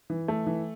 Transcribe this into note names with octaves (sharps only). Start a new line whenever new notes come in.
E3
A3
E3